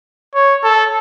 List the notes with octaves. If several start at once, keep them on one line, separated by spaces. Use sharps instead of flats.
C#5
A4